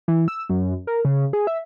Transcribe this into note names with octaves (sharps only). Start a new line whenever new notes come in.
E3
E6
F#2
A#4
C#3
G#4
E5